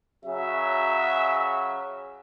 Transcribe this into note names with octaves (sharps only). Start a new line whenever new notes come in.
C#3 F#3 E5